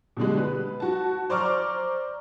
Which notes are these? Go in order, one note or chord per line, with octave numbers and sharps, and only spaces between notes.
B2 D3 G3 G#3
B4
F#4 A5
C5 D5 A#5 C#6 D6 F6